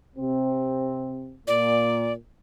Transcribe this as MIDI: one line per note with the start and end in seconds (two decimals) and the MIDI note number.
0.17 1.36 48
0.17 1.36 60
1.47 2.12 46
1.47 2.13 74